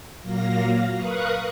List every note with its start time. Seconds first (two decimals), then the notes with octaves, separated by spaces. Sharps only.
0.21 A#2 F#3 A#3 F5 A#6
0.96 A#4 B4 F5 C#6 D#6 F#6